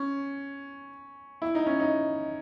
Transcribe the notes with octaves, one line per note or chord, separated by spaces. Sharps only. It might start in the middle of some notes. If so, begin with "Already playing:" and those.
Already playing: C#4
E4
D#4
C#4
D#4